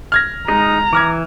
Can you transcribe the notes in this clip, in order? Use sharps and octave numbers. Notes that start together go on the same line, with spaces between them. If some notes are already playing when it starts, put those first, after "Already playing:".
F6 G#6 A#6
G#3 D#4 D#5 A#5
E3 D6 F6 G#6